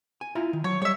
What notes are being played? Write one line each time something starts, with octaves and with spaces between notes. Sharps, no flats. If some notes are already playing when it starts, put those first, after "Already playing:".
G#5
E4 F4 A#5
D#3
F#3 C#5
G3 C#5 E5